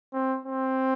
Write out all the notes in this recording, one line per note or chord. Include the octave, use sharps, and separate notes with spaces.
C4
C4